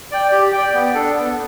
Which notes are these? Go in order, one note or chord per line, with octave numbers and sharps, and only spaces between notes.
D5 G5
G4
G5
D5
B3
D4 A4
B3